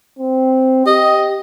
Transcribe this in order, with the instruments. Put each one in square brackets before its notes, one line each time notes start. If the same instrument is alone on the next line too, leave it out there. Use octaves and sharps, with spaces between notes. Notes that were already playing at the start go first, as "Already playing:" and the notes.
[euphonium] C4
[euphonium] G4 [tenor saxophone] D#5